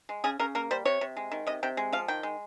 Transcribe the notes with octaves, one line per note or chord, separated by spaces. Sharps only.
G#3
C#3 G#4
C#3 A#4
A#3 A#4
G3 C5
C3 C#5
C3
G#3
D#3
C3 D#5
C3 G5
G#3
F3 F5
D#3 G5
G#3